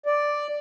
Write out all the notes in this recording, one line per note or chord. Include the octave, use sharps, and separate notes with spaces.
D5